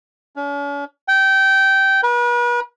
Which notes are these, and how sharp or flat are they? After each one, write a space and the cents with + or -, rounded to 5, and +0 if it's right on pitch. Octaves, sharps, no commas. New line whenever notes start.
C#4 +45
G5 -20
B4 -40